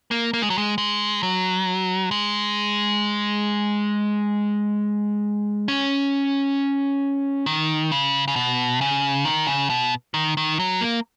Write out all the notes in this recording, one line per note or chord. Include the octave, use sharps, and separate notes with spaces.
A#3
A#3
G#3
F#3
G#3
G#3
F#3
G#3
C#4
D#3
C#3
C#3
B2
C#3
D#3
C#3
B2
D#3
D#3
F#3
A#3